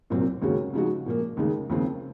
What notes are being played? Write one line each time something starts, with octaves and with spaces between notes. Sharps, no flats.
C2 A#2 F#3 C4
D#2 C#3 G#3 C#4 F#4
C#3 F3 G#3 D#4 F#4
A#2 F3 A#3
D#2 C#3 G#3 D#4
D#2 C#3 F3 C4 F4